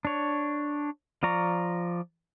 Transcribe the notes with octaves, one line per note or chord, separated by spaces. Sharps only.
D4 C#5
F3 F4 D5 A#5 C#6